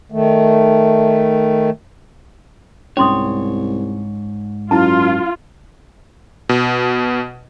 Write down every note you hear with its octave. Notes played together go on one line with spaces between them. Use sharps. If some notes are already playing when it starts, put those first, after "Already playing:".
D#3 A3
C2 G#2 C#4 C#5 C6 D#6
F#2 E4 F4 A5
B2